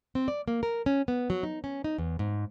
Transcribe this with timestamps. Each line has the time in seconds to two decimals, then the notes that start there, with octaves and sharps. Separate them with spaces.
0.15 C4
0.28 D5
0.48 A#3
0.63 A#4
0.86 C#4
1.08 B3
1.30 F#3
1.43 D#4
1.64 C#4
1.84 D#4
1.98 E2
2.19 G#2